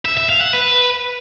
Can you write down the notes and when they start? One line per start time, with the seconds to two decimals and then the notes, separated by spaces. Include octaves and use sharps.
0.06 E5
0.17 E5
0.29 F5
0.41 F#5
0.53 B4